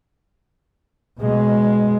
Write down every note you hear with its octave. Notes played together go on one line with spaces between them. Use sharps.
B2 G#3